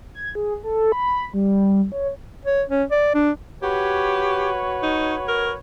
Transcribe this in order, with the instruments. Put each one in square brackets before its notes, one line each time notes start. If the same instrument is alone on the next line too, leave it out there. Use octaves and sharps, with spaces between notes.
[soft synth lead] G#6
G#4
A4
B5
G3
C#5
[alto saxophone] C#5
C#4
D5
D4
[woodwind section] F#4 B4 C#5 [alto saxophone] G4
[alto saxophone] D#4
A#4